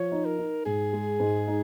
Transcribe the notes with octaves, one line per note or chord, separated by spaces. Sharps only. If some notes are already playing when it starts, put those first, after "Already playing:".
Already playing: F3 C#5
D#4
A#4
D#4
G#2 G#4
G#3
G#2
D#4